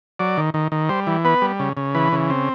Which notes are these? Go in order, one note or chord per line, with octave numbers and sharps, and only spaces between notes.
F#3 D5
D#3
D#3
D#3
G3 C5
E3
B3 B4
G3
C#3
C#3
E3 B4
C#3
C4